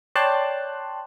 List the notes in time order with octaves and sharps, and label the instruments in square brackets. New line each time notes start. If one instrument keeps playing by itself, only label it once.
[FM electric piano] C#5 D5 G5 A5 C6 F#6